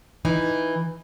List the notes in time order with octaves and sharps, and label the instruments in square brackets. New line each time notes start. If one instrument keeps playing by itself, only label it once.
[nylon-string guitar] E3 D#4